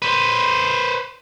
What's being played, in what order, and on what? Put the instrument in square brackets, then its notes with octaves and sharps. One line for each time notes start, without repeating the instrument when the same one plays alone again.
[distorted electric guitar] B4 C5